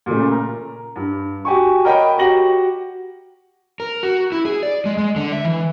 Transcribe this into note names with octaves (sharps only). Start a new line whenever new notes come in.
A#2 C#3 A3
A#4
G2
F#4 G4 G#5 C#6
A#4 C#5 D#5 F#5 G5 B5
F#4 G4 F#5 A#6 F#7
A#4
F#4
E4
G#4
D5
G#3
G#3
D3
E5
E3